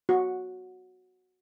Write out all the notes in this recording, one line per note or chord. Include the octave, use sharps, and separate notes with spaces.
F#4